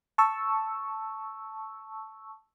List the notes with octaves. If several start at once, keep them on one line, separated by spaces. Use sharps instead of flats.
A5 C#6 E6